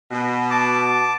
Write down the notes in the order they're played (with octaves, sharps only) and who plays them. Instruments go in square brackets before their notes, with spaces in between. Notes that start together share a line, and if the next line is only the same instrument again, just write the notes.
[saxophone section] B2
[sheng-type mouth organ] A5 D6